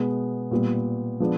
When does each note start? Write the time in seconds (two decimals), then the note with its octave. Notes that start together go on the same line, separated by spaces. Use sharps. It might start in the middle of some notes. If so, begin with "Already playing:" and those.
Already playing: B2 G#3 B3
0.51 A#2 G3 B3
1.20 F3 G#3 B3 D4